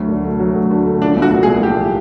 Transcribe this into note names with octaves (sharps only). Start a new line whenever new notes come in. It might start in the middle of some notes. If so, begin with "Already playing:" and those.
Already playing: D2 F#3
D3
A3
F#3
D2
D3
A3
F3 D4
C2
F#4
A#2
G#4
C2
F3 G4